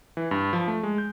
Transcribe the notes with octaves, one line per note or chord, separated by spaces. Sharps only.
E3
G2
F3
A3
G#3
G6